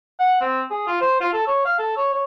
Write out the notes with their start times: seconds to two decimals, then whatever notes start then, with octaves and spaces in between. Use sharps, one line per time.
0.20 F#5
0.41 C4
0.71 G#4
0.87 F4
1.01 C5
1.21 F4
1.33 A4
1.47 C#5
1.65 F5
1.78 A4
1.97 C#5
2.13 C#5